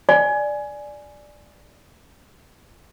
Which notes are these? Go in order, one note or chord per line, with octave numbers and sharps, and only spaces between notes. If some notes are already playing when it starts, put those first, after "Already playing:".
D5 G#5